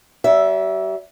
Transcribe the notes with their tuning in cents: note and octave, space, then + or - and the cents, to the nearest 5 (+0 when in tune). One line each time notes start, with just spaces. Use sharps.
G3 -45 E5 +0